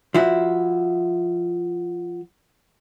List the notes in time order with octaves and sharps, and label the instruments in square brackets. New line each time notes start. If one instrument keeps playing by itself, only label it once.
[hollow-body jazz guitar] F3 E4 F#4